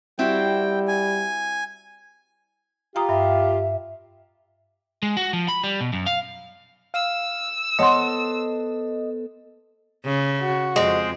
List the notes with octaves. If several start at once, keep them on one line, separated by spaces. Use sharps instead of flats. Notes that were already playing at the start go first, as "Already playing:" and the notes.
G3 C4 E4 F#4 G5
G#5
F4 G4 G5 A#5 D#6
G2 E5
G#3
F#4
F3
B5
G3
B2
F#2
F5
F5 E6
B3 A4 C5 C#5 D#5 F#5 C6
C#3
F#4
F2 G#3 C4